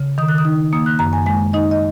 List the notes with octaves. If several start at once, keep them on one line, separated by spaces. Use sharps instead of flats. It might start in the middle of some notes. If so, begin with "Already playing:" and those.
Already playing: C#3
D#3 D#6
F#6
D#6
D#4
A#3 D#6
F#6
F#2 A#5
G#5
G#3 G#5
D#4 D#5
D#5